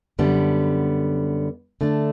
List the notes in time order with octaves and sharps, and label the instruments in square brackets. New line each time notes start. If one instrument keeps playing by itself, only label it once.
[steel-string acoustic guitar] F#2 D3 G3 B3
D3 A3 D4